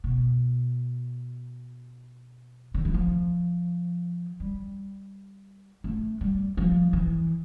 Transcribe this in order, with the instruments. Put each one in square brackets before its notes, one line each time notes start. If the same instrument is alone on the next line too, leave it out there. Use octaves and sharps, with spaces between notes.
[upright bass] B2
D3
E3
F3
G3
A3
G3
F3
E3